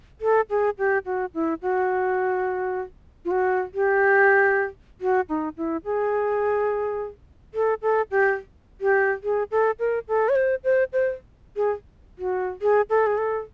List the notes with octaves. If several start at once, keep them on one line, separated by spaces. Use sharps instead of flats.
A4
G#4
G4
F#4
E4
F#4
F4
F#4
G4
F#4
D#4
E4
G#4
A4
A4
G4
G4
G#4
A4
A#4
A4
C#5
C5
C5
C5
G#4
F#4
G#4
A4
G#4
A4